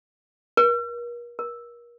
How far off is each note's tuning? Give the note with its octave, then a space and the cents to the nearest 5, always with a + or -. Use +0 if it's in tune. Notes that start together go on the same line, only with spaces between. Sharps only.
A#4 +40
A#4 +35